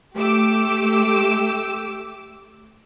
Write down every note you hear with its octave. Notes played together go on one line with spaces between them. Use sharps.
A3 G4 D6 E6